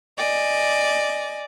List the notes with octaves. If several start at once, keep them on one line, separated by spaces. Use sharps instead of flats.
D5 D#5 G#5